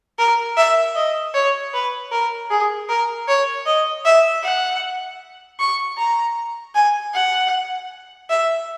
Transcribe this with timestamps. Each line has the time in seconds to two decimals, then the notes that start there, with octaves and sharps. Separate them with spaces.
0.19 A#4
0.57 E5
0.96 D#5
1.34 C#5
1.74 B4
2.12 A#4
2.50 G#4
2.89 A#4
3.28 C#5
3.66 D#5
4.05 E5
4.44 F#5
5.60 C#6
5.98 A#5
6.75 G#5
7.14 F#5
8.30 E5